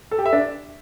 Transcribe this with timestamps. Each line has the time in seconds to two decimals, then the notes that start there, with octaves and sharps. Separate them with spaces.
0.11 A4
0.19 G4
0.26 E5
0.33 D4